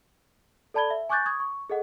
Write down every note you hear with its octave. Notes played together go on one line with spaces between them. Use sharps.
A4 D5 A5 B5 G#6 G7
E5
G#5 C#6 D6 F#6 G6 A6
C#6 D#6 G#6
C#6
G#4 A4 D#5 F#5